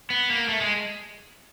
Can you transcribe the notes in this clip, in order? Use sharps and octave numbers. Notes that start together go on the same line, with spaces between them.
B3
A#3
A3
G#3